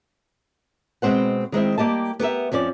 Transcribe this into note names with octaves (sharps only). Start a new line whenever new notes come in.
B2 G#3 C4 C5 F#5
D#3 G#3 C4 E4
G3 A#3 G4 D#5 A5
B3 G4 A#4 E5
F2 F3 C#4 D5